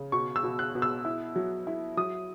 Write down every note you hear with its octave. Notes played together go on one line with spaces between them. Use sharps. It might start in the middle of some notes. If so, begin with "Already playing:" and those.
Already playing: C#3
B2 C#6
E6
B2
F#6
B2
E6
E4
F#3
E4
F#3 D#6